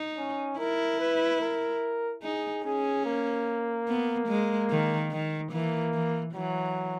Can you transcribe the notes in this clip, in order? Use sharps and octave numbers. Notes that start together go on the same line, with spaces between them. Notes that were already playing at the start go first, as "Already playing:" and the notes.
Already playing: D#4
C#4
E4 A#4
B4
A#4
D#4 G#4
C#4 G#4
A#3
B3
G#3
D#3
D#3
E3 A#3
E3
E3 F#3